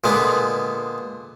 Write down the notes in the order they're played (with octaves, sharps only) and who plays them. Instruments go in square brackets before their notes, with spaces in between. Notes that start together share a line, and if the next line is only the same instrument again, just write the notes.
[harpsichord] A#2 D3 G#3 B3